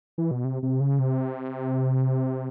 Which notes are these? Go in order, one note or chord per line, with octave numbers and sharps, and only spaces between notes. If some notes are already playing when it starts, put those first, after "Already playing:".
E3
B2
C3
C3
C#3
C3